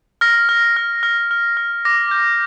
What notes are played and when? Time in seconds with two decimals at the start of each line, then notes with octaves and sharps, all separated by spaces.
0.21 F6 A#6
0.49 F6
0.77 F6
1.03 F6
1.31 F6
1.57 F6
1.85 D6 A#6
2.11 G6